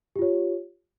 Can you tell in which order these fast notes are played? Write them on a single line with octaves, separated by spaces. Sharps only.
G4 F4 C#5